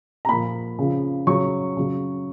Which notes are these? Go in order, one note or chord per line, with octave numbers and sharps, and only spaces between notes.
A#5
A#2 F3 B5
C#3 F3
C#3 F#3 C#6
C#3 F#3